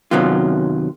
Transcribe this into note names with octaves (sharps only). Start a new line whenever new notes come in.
F#2 C3 D#3 F#3 B3 F4